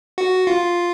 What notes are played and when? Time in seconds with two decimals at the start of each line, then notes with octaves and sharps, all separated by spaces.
0.18 F#4
0.47 F4